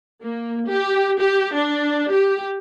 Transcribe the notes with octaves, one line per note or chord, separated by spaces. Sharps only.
A#3
G4
G4
D4
G4